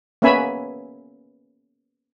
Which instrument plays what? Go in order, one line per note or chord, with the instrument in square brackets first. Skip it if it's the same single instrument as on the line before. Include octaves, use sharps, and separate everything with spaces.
[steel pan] A#3 B3 C#4 E5 G#5 B5